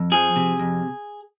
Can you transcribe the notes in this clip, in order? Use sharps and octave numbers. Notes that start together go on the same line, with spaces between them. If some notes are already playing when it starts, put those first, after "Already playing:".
Already playing: F2
F3 G#4
C3
F2